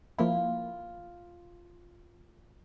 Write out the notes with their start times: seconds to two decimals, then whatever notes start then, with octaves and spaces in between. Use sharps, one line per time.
0.18 F3 A#3 E4 F4